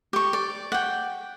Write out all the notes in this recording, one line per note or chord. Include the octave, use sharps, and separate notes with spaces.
G4 C#6
D5
F#5 G5